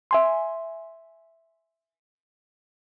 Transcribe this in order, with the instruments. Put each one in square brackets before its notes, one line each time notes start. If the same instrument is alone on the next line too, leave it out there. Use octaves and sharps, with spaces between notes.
[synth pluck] E5 G#5 C6